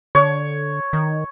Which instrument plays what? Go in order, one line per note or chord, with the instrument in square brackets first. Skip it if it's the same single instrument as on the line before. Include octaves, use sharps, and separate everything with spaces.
[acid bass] D3 [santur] C#5
[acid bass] D#3